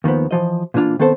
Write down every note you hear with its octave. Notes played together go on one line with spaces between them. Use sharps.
D#2 D#3 F3 B3
E3 F3 D#5
A#2 E3 D4 F4
D#3 B3 C4 A4 C5